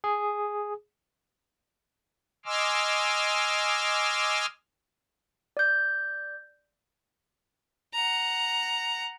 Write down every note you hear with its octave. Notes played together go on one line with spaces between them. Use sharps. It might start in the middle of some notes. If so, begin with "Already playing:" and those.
G#4
D#5 G#5 C6 D6 E6 F6
D5 G6
F#5 A#5